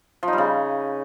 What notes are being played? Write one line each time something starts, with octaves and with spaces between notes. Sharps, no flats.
F3
D#4
G3
C#3